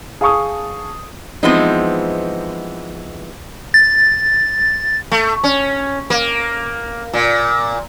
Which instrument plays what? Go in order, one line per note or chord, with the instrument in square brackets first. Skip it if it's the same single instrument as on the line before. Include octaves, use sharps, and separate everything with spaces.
[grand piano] G#4 F5 A5 C#6 D#6
[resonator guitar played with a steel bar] E3 F3 G#3 B3 C4 D#4
[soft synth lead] A6
[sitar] A3
C#4
A#3
A#2